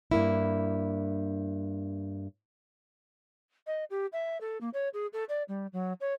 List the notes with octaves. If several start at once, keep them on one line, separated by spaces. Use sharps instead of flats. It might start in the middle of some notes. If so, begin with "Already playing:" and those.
G2 A#3 E4
D#5
G4
E5
A4
A#3
C#5
G#4
A4
D5
G3
F#3
C#5